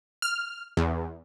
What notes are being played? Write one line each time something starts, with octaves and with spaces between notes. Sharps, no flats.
F6
E2